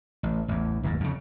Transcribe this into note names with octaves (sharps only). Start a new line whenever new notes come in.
A1
A1 E2
F#1 D#2 G#2
F2 C#3